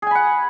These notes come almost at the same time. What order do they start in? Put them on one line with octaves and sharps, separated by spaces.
G#4 G#5 B5 F#5